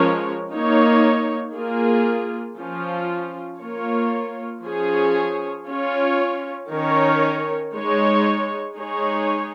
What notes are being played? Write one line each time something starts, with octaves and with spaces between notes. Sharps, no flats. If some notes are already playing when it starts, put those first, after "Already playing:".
Already playing: F3 G#3 C#4 A#4 C#5
A#3 D#4 C#5
A#3 F4 G#4
F3 C#4 F4
A#3 F4 C#5
F3 C#4 G#4 C#5
C#4 F4 C#5
D#3 C#4 A#4 C#5
G#3 D#4 C#5
G#3 D#4 G#4 C#5